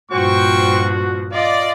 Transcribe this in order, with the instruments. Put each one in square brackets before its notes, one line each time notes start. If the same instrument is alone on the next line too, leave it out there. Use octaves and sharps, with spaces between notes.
[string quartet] G2 A#2 F3 [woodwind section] F#4 [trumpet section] C5 G5 C#6
[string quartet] F4 D#5 [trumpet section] D5